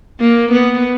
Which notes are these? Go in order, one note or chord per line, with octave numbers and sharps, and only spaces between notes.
A#3
B3